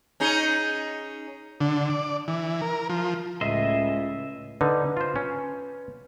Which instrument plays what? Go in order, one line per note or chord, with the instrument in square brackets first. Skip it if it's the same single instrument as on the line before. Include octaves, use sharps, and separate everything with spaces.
[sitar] C#4 D#4 G#4
[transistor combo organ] D3
D5
E3
A#4
F3
[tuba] C#2 [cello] A2 C#3 [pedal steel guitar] D#5 E5 C6
[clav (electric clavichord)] D3 D#4 [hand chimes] B4
[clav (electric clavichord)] F4 C5
C#4